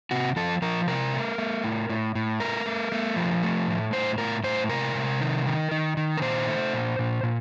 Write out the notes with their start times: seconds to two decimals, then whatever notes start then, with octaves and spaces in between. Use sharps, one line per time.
0.11 C3 F#4
0.36 F3 A4
0.62 F3 A#4
0.87 C3 A#4
1.14 A3
1.38 A3
1.64 A2
1.89 A2
2.15 A2
2.40 A3 A#4
2.66 A3
2.92 A3
3.16 F3
3.43 A3
3.68 A2
3.93 A2 C5
4.18 A2 A#4
4.43 A2 C5
4.69 C3 A#4
4.95 C3
5.20 D#3
5.46 D#3
5.71 D#3
5.97 D#3
6.18 A#4
6.21 A#2 C5
6.48 A3
6.73 A#2
6.99 A#2
7.23 A#2